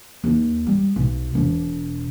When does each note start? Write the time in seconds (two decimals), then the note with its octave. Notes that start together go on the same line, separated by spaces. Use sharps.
0.24 D#2 D#4
0.67 G3
0.96 B1
1.35 E1 B2